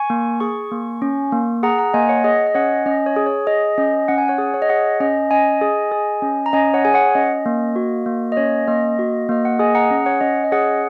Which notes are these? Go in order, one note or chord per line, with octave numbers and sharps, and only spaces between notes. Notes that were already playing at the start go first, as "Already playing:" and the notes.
Already playing: G#5 C#6
A#3
G#4 G#5 C#6
A#3
C#4
A#3
G#4 F#5 A#5
F#5 A#5
A#3 D#5 G#5
C#5 F#5
G#4 D#5
D#5
C#4 C#5 F#5
C#4 D#5
C#5
G#4
C#5
G#4 D#5
C#4 D#5
C#4 F#5
G#5
C#5 F#5
G#4
C#5
D#5
G#4 C#5 F#5
C#4 D#5
C#4 D#5 G#5
G#4
G#4
C#4
A#5
C#4 D#5 G#5
C#5 F#5
G#4 G#5
C#5 F#5
C#4 D#5
A#3
F#4
A#3
D#5
C#4 C#5
A#3 D#5
F#4
A#3 D#5
F#5
G#4 D#5 G#5
F#5 A#5
C#4
C#5 F#5
C#4 D#5
D#5
G#4 C#5 F#5